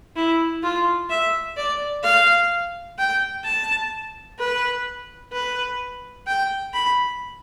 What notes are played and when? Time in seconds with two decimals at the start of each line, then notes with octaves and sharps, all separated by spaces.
0.16 E4
0.63 F4
1.10 E5
1.57 D5
2.04 F5
2.98 G5
3.44 A5
4.39 B4
5.33 B4
6.27 G5
6.74 B5